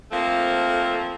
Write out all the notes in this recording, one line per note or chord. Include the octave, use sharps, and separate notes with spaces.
F3 A3 A#3 C4